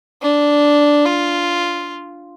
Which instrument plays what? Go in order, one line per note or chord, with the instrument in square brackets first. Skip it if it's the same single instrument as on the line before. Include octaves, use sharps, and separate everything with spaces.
[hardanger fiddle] D4
F4